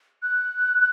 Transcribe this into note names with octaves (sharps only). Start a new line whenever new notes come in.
F#6